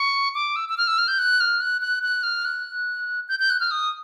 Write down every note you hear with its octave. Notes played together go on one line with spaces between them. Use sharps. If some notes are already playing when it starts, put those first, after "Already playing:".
Already playing: C#6
D6
E6
E6
F6
E6
F6
G6
F#6
F6
F#6
F#6
F#6
F6
F#6
G6
G6
F#6
F6
D#6